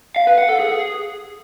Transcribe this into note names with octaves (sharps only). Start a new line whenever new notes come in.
F5
B4
F#5
A4
G#4